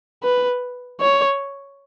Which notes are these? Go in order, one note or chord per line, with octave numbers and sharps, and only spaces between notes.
B4
C#5